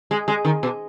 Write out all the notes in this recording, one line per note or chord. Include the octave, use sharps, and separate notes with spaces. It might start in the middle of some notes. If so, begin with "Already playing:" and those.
G#3
G#3
D#3
B2